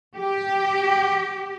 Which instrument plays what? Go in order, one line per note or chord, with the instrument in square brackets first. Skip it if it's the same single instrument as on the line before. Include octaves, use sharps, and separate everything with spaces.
[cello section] G4